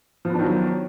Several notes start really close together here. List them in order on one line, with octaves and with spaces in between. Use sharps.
F3 B3 D4 D#3 F#3